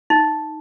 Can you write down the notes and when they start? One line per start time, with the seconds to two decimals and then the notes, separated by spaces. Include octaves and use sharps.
0.10 D#4